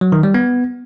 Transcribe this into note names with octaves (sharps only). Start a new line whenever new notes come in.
F#3
D#3
G3
B3